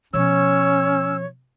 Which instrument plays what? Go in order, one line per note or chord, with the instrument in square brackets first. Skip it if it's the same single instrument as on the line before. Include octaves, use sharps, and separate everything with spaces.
[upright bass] B2 F3 [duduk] C#4 [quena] C#5 [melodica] E6